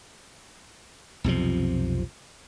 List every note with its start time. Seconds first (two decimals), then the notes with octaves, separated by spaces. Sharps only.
1.24 B1 F2 C3 F3